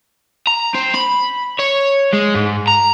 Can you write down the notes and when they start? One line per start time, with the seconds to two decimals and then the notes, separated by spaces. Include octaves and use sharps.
0.47 A#5
0.74 C4
0.94 B5
1.60 C#5
2.13 G#3
2.35 G#2
2.68 A#5